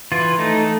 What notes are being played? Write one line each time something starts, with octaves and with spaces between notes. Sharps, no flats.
E3 F4
A3 D#4